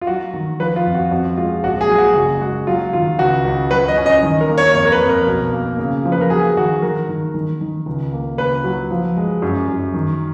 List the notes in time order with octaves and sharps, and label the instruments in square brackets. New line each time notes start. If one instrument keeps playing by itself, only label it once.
[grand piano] F4
F#3 F#4
D#3
F3 B4
F4
F2
F#4
F2 F#4
G#3 F4
A#1 F#4
G#4
F#3
F#4
F#1 F#4
G#3 F#4
F#3 F4
D#3 F4
C#2 F#4
C#2
F#3 B4
D#5
C#4
D#5
D#3
A#4
A#3
C#5
F2 C#5
A#4
B4
F2
A#4
B1
A#3
C#3
F3
B4
A#4
F#3 G#4
D#3 F#4
D#3 A#4
D#3
D#3
D#3
C#2
A#3
C#2 B4
F#3
F3
G#3
F#2
F#2
D#3